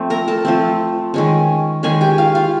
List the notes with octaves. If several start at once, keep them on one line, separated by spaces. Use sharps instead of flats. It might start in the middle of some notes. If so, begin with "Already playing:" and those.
Already playing: F3 A3 C4
A#4 A#5
A4 A5
F3 A3 C4
D#3 G#3 C#4
D#3 G#3 C#4 G#4 G#5
G4 G5
F4 F5
F4 F5